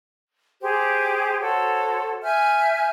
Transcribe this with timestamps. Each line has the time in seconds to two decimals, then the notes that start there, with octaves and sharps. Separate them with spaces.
0.61 G4 G#4 C5
1.41 F#4 A4 C5 C#5
2.22 E5 G#5 F6 G6